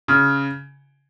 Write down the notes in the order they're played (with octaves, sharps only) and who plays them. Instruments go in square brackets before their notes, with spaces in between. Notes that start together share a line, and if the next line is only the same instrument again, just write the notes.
[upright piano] C#3